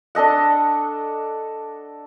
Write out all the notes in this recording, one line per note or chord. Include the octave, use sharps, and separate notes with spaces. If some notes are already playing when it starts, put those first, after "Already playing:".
D4 A4 D#5 F#5